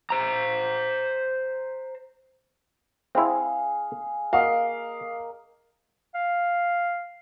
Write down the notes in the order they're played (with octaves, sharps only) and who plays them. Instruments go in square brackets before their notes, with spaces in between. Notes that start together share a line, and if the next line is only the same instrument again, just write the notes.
[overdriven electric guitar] C5 A#5
[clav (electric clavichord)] C4 E4 [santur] G#4 F5
[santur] A#3 D#5 [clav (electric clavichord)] F#4 [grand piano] F5
[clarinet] F5